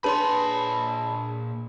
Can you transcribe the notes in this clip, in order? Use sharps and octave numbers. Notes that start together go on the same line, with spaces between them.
A#2 D4 G#4 B4 C#5 A5 B5 C6